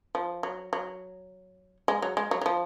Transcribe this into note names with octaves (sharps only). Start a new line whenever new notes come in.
F3
F#3
F#3
G#3
F#3
G#3
F#3
F#3
F3